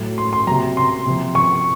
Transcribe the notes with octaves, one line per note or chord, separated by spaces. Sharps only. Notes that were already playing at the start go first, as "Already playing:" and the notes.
Already playing: A2 F#3
C6
C6
C3 F#3 A#5
C6
C3 F3
C#6